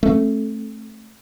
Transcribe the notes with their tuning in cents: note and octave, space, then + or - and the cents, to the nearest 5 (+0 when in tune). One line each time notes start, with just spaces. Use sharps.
A3 -5 C4 +45